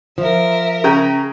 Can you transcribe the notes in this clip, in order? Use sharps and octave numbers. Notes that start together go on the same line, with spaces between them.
F3 A#4 E5
C#3 G5 A#5